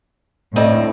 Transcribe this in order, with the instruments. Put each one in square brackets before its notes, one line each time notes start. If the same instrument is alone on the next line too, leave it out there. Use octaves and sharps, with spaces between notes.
[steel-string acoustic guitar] D2 C4 [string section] A2 [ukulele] D#4 D5 D#5